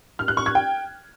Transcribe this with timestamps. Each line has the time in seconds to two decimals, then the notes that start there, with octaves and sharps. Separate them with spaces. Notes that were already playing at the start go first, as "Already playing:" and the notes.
0.19 F6
0.28 F#6
0.37 C#6
0.46 G#6
0.55 G5